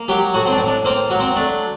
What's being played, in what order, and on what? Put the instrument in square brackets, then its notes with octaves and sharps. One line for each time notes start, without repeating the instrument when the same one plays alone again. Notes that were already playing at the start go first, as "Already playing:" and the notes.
Already playing: [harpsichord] A#3
F#3 G4
A2 F#4
C4
D4
A2
D4
A#3 C4
F#3
C4
A3 D4